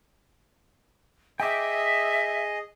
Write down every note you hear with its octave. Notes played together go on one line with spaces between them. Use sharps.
G#4 D#5 E5 G5 D6